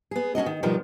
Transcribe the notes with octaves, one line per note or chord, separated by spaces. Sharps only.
B3 G#4
C#4 D4 F#4 D#5
D#3
B2 D#3 F3 G3